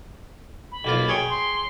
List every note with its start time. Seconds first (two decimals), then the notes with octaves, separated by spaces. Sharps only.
0.72 B5
0.84 B1 A#3 F4
1.08 G#4 C#5 G5
1.30 C6